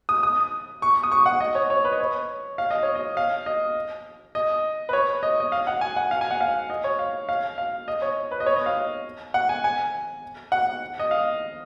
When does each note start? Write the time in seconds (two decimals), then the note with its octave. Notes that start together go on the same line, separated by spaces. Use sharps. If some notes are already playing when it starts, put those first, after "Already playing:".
0.09 D#6
0.23 D#6
0.82 C#6
1.03 D#6
1.12 C#6
1.26 F#5
1.41 D#5
1.55 C#5
1.70 C#5
1.85 B4
1.93 D#5
2.00 C#5
2.58 F5
2.71 D#5
2.83 C#5
2.95 D#5
3.17 F5
3.46 D#5
4.35 D#5
4.89 B4
4.93 C#5
5.23 D#5
5.40 D#5
5.52 F5
5.67 F#5
5.81 G#5
5.97 F#5
6.11 F5
6.21 G#5
6.31 F#5
6.41 F5
6.70 D#5
6.84 C#5
6.99 F5
7.29 F5
7.58 F5
7.88 D#5
8.02 C#5
8.31 B4
8.40 D#5
8.46 C#5
8.56 D#5
8.66 F5
9.34 F#5
9.49 G#5
9.64 G#5
10.52 F#5
10.99 D#5
11.11 F5